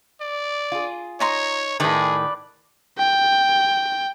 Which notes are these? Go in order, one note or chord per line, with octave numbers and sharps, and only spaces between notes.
D5
F4 G#4
D#4 C#5 A#5 C6
A2 D#3 G#4 B4 D5
G5